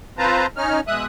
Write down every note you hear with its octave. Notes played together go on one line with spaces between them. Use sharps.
C4 F4 B4 C5 A5 A#5
C#4 D#4 F6
B2 G#3 E5 D#6 F#6